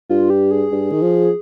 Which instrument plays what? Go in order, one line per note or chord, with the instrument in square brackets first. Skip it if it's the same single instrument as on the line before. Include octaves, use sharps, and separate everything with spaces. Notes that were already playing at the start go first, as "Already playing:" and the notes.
[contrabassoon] G2 [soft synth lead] F4
[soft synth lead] G4
G#4
[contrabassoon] G2
D#3
F3